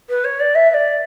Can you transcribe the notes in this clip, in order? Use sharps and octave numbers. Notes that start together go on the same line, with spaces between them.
B4
C#5
D5
E5
E5
D5